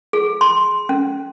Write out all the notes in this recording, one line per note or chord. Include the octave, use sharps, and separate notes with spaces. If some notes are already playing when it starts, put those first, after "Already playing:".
G#4
C6
C#4